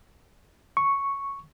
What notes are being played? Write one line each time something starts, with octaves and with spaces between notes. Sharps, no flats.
C#6